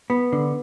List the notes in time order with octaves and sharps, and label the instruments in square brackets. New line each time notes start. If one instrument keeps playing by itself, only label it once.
[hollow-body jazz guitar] B3
D3